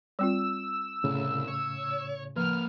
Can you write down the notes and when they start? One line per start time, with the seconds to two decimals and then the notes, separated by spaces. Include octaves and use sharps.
0.19 G3 C4 F4 E6
1.04 C2 A2 C#3
1.48 C#5
2.36 F3 A#3 B4 F6